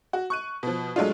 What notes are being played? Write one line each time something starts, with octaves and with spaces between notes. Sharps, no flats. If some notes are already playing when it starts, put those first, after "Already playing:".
F#4
C#6 F#6 D#7
B2 F3
F#3 G#3 A3 D4 F4